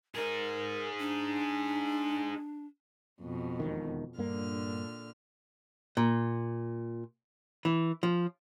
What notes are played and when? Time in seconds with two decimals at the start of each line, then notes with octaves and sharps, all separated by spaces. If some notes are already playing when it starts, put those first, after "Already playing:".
0.15 D#4 G#4 A#4
0.99 D4
3.21 F2 B2
3.60 E1 A#1 D#3
4.18 G2 A#2 D3 A#3 F6
5.97 A#2
7.65 E3
8.03 F3